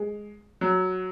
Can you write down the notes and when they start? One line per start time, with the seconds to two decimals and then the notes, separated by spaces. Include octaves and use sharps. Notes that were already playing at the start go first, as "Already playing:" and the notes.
Already playing: G#3
0.61 F#3